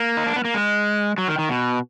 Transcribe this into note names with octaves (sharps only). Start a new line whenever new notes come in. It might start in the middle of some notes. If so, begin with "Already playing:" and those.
Already playing: A#3
D#4
D4
B3
A#3
G#3
F#3
D#3
D#3
B2